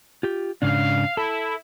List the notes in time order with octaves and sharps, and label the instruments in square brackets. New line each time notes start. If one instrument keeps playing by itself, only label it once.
[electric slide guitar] F4 G4
[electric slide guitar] G#2 C#3 D4 [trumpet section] F5
[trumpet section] E4 [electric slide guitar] A4